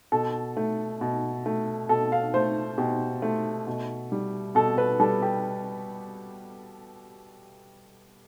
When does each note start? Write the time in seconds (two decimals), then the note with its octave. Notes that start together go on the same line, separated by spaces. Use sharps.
0.12 B2 A4
0.57 A3
1.01 B2
1.46 A3
1.89 B2 A4
2.12 F5
2.34 A3 C5
2.78 B2 G4
3.22 A3
3.67 B2
4.12 G3
4.55 B2 A4
4.78 B4
5.00 G3 A4
5.22 G4